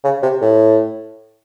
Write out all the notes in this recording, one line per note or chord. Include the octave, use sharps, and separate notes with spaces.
C#3
C3
A2